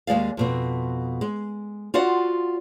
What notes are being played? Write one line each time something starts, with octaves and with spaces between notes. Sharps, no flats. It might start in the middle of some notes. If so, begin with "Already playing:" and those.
D#2 G#3 D5 F5
F2 B2 C4
G#3
F4 F#4 C5 D5 F#5